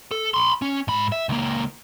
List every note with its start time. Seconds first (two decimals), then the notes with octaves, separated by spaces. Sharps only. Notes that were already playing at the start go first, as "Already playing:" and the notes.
0.11 A4
0.34 B5 C6
0.62 C#4
0.88 G#2 B5
1.12 E5
1.29 C#2 A#3